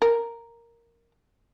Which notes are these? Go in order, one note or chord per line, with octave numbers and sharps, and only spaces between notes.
A#4